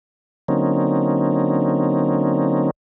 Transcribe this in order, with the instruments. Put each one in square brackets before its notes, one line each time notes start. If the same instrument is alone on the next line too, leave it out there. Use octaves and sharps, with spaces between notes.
[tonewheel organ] D3 F#3 A#3 C4 C#4 D#4